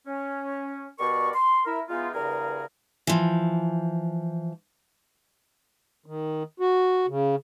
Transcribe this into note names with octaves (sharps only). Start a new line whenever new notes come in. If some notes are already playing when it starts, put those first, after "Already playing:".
C#4
B2 G3 A#4 D5 C#6
C6
E4 A#4
E3 G#3 B3 D#4 F4
E2 G2 C#3 G#4 A#4
E3 F3
D#3
F#4
C#3